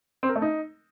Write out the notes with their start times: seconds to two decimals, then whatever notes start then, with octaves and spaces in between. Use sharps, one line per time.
0.23 C4
0.29 A#4
0.36 A3
0.42 D#4